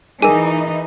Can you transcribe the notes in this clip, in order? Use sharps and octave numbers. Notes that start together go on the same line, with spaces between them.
E3 D#4 G#4 A#4 G#5